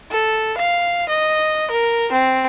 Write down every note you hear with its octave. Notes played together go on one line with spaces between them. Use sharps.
A4
F5
D#5
A#4
C4